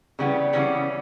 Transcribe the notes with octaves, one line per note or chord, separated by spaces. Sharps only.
C#3 E3 G3 B3
C#3 E3 G3 B3 C#4